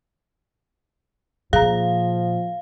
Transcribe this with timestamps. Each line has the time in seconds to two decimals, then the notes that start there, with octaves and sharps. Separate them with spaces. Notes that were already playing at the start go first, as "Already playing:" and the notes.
1.53 A#2 F3 G#4 F5 A#5